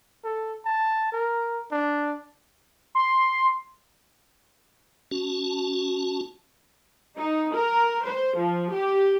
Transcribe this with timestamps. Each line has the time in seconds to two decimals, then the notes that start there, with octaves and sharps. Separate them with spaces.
0.24 A4
0.66 A5
1.12 A#4
1.71 D4
2.95 C6
5.11 C#4 F#4 A5
7.18 D#4
7.55 A#4
8.04 C5
8.37 F3
8.71 G4